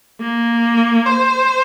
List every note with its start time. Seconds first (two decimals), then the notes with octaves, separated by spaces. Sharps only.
0.21 A#3
1.06 C5